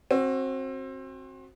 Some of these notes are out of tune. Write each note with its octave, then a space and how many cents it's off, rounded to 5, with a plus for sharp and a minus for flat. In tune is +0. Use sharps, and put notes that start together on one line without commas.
C4 +25 F#4 +0